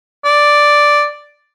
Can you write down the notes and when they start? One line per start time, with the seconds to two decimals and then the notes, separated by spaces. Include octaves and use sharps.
0.25 D5